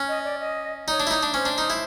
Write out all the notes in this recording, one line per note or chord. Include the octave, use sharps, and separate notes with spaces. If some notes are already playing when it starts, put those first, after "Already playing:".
Already playing: C#4
D#5
D5
D#5
D#4 C#5 D5
D4
E4
D#4
D4
C#4 C5
D4
D#4
E4